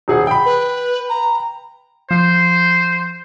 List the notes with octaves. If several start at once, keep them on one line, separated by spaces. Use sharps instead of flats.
D#1 G#4 F#5
G5 B5
B4
A#5
F3 C5